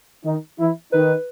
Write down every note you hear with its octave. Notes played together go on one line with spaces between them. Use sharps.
D#3 D#4
E3 E4
D#3 D#4 B4